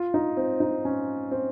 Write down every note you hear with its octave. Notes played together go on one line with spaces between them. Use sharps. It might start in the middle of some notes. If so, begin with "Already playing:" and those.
Already playing: F4
D#4
C4
D#4
C#4
C4